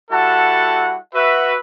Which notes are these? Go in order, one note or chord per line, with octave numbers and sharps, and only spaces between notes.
G3 E4 F#4 A4 F#5 A5
F#4 B4 E5